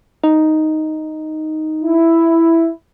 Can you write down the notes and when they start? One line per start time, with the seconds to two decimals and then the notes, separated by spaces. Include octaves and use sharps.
0.24 D#4
1.82 E4